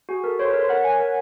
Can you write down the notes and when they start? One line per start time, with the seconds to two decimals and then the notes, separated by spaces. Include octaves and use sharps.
0.09 F#4 G#4
0.24 A4 A#4
0.39 C5 C#5
0.49 B4
0.54 A#4
0.59 C5
0.69 A#4 F#5
0.84 C#5 G#5
1.00 A#4